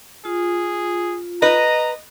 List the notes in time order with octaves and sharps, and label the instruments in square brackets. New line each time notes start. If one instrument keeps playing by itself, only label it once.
[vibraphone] F4 [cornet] G#4
[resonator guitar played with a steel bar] B4 [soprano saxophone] D#5 [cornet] A#5